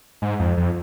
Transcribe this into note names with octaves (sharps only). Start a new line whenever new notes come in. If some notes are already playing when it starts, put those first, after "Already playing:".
G#2
F2
F2